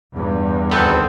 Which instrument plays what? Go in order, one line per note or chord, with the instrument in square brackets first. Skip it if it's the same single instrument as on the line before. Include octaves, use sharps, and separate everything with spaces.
[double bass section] E2 G2
[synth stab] G#1 D2 B3 [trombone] C4 [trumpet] A4